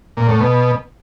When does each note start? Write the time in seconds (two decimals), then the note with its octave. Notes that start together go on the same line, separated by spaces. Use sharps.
0.17 A#2
0.29 A2
0.40 B2